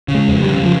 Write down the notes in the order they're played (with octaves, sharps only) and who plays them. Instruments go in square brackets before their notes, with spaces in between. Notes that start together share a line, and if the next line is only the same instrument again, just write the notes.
[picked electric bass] C#3
G#3
F2
G3
C#3
F3